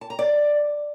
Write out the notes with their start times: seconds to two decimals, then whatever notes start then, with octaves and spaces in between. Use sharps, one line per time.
0.01 A5
0.10 A#5
0.19 D5